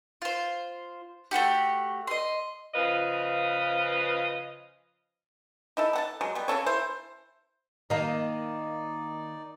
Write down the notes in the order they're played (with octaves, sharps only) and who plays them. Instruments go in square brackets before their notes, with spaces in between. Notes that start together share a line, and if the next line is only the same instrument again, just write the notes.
[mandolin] F4 C5
A3 C#4 F#4 G4
D#5 C6
[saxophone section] C#3 F3 B4 D#5 F5
[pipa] D#4 E4 A4
A4 F#5 A5
F#3 G#3
G3 B3
C#3 C#4 A4 C#5
E4 C5
[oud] D#3 A#3 [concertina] D#4 D5 [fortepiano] D#5 F5 A#5